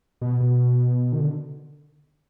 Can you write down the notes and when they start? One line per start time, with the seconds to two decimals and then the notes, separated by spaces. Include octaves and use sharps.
0.21 B2
0.40 B2
1.12 D#3
1.19 D3